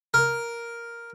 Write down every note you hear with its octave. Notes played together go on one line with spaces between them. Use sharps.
A#4